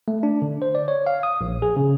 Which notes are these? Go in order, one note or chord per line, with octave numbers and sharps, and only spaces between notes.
A3
D4
D3
C5
D5
C#5
F5
D#6
A#1
G#4
C#3